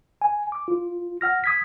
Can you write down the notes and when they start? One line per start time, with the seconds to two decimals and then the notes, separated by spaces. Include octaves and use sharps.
0.22 G#5
0.52 D6
0.68 F4
1.21 F#5 F6 A#6
1.44 D#6 G#6 B6